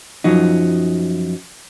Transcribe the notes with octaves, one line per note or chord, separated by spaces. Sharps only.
F#2 F3 F#3 D#4